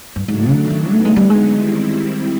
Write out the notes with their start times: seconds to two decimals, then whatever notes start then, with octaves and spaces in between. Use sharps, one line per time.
0.16 G2
0.28 G#2 C#3 F#3 A3 D4
0.50 D3
0.70 D#3
0.91 D3 F#3 A3 B3 D#4
1.05 G#3
1.16 G3
1.30 G#3
1.55 D#3 G3 C4 E4